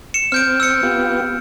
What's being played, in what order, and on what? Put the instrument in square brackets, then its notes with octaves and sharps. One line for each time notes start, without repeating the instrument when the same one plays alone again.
[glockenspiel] C#7 E7
[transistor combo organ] C4 [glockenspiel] F6 G6 D7
[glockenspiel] E6 C#7
[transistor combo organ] B3 F4 G4